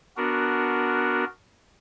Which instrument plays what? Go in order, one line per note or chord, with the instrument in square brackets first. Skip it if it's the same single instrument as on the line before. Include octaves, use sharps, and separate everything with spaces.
[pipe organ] B3 D4 F#4 A#4